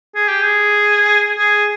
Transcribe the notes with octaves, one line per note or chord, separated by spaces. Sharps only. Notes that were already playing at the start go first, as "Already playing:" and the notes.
G#4
G4
G#4
G#4